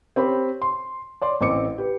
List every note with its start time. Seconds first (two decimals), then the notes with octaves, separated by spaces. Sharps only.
0.16 C4 G4 C#5 B5
0.62 C6
1.21 C#5 D5 C6
1.41 A1 C4 D6 C#7
1.78 G4 B4